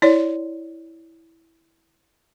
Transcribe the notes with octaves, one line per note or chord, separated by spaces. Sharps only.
E4 C#5 D5